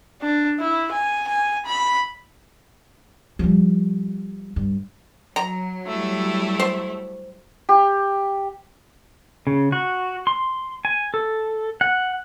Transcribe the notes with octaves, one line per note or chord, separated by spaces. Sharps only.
D4
E4
G#5
G#5
B5
F3 G3
G2
F#3 A#5
G3 A3 E4
C5
G4
C#3
F#4
C6
G#5
A4
F#5